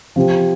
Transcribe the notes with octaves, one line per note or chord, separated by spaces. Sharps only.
C3 F3